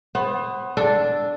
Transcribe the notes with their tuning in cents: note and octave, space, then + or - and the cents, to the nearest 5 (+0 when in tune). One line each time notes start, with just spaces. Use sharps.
B3 +15 C5 +40
D4 +0 A4 +0